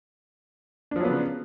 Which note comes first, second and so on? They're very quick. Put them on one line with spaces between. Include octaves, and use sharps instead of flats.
D4 F3 F#3 B3 C#3